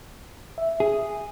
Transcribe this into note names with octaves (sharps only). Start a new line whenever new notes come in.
E5
G#4